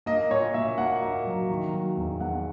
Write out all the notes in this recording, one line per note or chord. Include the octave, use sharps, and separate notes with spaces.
A#3 D#5
A#2 C#5
A#2 E5
A#3 F#5
A#3
F#3
D#3
F#3
E2
E2 F#5